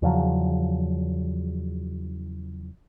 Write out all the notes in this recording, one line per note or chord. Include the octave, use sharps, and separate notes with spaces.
E2 C#3 F3 F#3